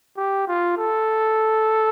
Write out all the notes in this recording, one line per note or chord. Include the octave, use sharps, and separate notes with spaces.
G4
F4
A4